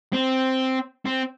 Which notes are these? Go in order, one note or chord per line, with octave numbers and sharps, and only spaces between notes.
C4
C4